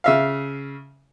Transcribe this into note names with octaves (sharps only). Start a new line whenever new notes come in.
C#3 E5 F5